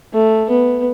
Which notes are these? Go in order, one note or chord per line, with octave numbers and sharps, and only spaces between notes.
A3
B3